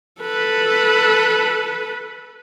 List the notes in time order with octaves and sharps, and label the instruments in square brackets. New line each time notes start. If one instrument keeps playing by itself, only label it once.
[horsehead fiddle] A4 B4